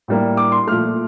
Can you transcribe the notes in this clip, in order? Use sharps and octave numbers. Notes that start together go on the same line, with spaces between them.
A2 G3 A#3
D6
C6
A#2 F3 A3 F6